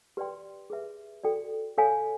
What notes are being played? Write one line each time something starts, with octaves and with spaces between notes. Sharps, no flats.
G4 B4 D5 G5 C6
G#4 B4 E5
F#4 A4 D5 G5
A4 C#5 F5 G#5